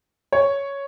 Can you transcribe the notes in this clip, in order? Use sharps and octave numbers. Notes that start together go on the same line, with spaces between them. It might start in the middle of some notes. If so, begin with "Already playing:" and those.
C#5